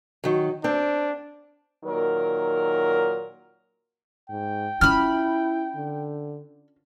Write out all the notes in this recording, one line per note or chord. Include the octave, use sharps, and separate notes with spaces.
D#3 F#3
C4 D4
A#2 D#3 F#3 A#4
G#2 G5
C#4 E4 F4 B5 F6
D3